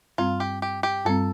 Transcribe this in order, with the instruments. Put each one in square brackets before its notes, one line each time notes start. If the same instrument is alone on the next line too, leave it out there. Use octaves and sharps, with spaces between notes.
[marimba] G2 G3 C4 [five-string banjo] F4
[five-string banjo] G4
G4
G4
[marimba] G2 G3 C4 [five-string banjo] A4